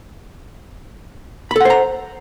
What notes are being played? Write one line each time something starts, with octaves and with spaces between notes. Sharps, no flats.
A4 C5 F#5 A#5 B5